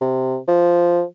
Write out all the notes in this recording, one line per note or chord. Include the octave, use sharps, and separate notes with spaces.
C3
F3